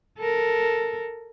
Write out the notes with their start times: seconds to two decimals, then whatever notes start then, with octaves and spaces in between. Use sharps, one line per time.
0.19 A4 A#4